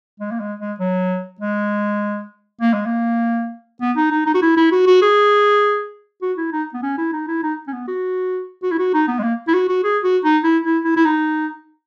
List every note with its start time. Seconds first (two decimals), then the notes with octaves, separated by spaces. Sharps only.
0.19 G#3
0.32 A#3
0.40 G#3
0.60 G#3
0.79 F#3
1.40 G#3
2.61 A#3
2.73 G#3
2.86 A#3
3.81 B3
3.96 D#4
4.11 D#4
4.26 D#4
4.34 F#4
4.42 E4
4.57 E4
4.72 F#4
4.86 F#4
5.02 G#4
6.22 F#4
6.37 E4
6.52 D#4
6.74 B3
6.82 C#4
6.98 E4
7.13 D#4
7.28 E4
7.43 D#4
7.67 C#4
7.73 B3
7.88 F#4
8.63 F#4
8.72 E4
8.78 F#4
8.94 D#4
9.08 B3
9.19 G#3
9.23 A#3
9.47 E4
9.54 F#4
9.69 F#4
9.84 G#4
10.04 F#4
10.24 D#4
10.44 E4
10.64 E4
10.84 E4
10.97 E4
11.05 D#4